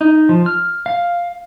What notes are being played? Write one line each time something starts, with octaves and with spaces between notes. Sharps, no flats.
D#4
F3
F6
F5